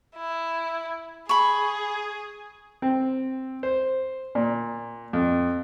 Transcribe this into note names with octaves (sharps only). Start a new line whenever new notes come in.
E4
G#4 B5 C#6
C4
C5
A#2
F2